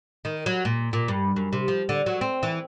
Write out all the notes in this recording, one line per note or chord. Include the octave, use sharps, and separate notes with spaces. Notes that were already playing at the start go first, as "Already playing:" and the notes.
D#3
F#3
A#2
A#2
G2
F#2
C3
F3
D3
F#3
C4
E3